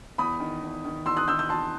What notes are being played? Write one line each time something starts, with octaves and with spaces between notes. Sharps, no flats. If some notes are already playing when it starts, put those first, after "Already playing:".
E2 B5 D#6
D#3
E2
D#3
E2 C6 E6
D#6 F#6
D#3 E6 G6
E6 G6
E2 A5 C6